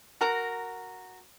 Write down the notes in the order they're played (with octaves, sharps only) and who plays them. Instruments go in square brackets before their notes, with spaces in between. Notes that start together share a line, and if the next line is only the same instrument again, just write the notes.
[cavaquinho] F#4 A#4 A#5